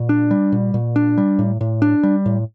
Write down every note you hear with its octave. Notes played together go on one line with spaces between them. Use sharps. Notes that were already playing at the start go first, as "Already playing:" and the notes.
Already playing: A#2
D4
G3
A#2
A#2
D4
G3
A2
A2
D4
G3
A2